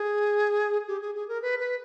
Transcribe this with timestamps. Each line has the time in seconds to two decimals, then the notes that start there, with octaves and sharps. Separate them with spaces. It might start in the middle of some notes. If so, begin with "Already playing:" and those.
Already playing: G#4
0.88 G4
1.01 G#4
1.15 G#4
1.29 A#4
1.42 B4
1.59 B4